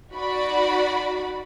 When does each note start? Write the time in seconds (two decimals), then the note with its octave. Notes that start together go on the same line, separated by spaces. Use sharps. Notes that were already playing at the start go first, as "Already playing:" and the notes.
0.15 D#4 F#4 D5 B5